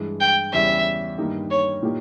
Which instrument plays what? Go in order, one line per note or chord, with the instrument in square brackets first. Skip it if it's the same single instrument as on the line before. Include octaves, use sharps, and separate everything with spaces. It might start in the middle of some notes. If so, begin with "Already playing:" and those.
Already playing: [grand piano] G2 E3 G#3
[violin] G5
[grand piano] E2 C#3 G3 C#4 [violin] E5
[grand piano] G2 D#3 A#3 D#4 G4
[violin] C#5
[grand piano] A#2 A#3 D#4 G4